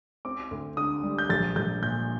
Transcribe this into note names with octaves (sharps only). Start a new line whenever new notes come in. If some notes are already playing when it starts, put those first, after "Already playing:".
C4 D6
D2
D3 D#6
G3
G6
A#1 A6
A#1 G6
A#2 G6